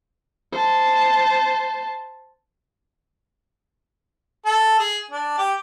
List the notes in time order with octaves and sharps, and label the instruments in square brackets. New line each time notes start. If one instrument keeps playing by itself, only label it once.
[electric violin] C5 A5
[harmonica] A4
G#4
D4
G4